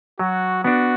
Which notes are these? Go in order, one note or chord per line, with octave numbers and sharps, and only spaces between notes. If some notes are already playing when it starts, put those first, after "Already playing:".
F#3 F#4
B3 D4 F#4